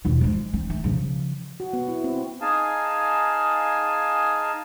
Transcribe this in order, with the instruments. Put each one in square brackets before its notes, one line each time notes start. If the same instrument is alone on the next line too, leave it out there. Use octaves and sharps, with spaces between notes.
[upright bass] E1 F4
F3 G#3
C4
A3
C#3 F3
[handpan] F#4
B3
E4
C4
[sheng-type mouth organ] D#4 G#4 F5 G#5 A5